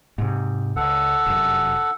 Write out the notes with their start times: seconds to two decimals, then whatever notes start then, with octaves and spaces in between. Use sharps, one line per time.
0.18 G#2 C3
0.76 C#2 A4 F#5
1.26 F1 F#2